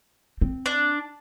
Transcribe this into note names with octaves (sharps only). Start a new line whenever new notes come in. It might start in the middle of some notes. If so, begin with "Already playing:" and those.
C4
D4